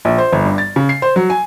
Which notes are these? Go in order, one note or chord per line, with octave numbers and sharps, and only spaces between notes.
A#1
C5
G1
G2
A6
C#3
C7
C5
F#3
G#5